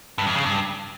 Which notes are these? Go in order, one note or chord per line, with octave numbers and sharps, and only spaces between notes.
G2
F2
C#3
G2